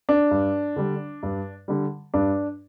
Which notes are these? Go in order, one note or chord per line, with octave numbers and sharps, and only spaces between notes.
D4
G2
D3 G3
G2
D3 G3
G2 D4